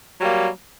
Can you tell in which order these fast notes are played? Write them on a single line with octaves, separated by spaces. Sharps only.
F#3 G3 A#3